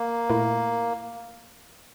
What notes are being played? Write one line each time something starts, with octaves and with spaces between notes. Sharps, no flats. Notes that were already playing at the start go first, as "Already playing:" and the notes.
Already playing: A#3
A#2 A3 E4 A#4